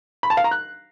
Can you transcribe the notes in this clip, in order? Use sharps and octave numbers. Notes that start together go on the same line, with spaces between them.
B5
A5
F5
A#5
F#6